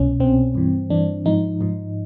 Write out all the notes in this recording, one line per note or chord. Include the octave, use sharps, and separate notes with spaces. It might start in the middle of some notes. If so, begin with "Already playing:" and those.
Already playing: C2 B2 C#4
C2 B2 C4
G2 E3
G2 E3 D4
G#2 F3 D#4
G#2 F3